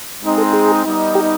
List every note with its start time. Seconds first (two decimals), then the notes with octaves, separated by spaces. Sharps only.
0.23 G#3 C4 D#4
0.38 A4
0.53 G#4
0.85 G3 B3 D#4
1.15 G4